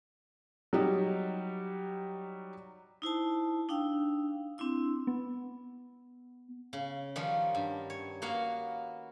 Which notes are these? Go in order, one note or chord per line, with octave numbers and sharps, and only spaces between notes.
F#3 G3 D#4
D#4 E4 C5 A5
D4 D#4 F5 G5 E6
C4 D4 E4 E6
B3
C#3
D#3 F3 G3 B3 C#4
G2
C#5
A#3 B3 F#4 C#5 F5